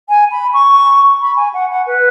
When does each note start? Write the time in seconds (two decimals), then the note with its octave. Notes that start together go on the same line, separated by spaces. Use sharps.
0.09 G#5
0.31 B5
0.53 C#6
1.20 B5
1.36 G#5
1.54 F#5
1.70 F#5
1.86 B4